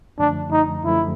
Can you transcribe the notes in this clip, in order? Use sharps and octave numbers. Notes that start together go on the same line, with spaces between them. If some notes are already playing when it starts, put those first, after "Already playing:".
F#2 D3 F3 A3 D4
D#4
F#2 D3 F3 A3 E4